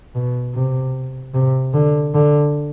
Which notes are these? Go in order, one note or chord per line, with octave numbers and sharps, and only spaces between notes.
B2
C3
C3
D3
D3